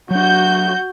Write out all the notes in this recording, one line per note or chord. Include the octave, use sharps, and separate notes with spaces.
F#3 D4 F#4 G6